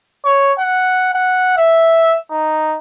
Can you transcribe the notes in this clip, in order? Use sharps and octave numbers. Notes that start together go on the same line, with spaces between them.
C#5
F#5
F#5
E5
D#4